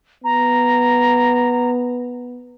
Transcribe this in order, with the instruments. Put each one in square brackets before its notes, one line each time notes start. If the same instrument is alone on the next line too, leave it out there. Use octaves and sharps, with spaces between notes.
[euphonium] B3 [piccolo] A#5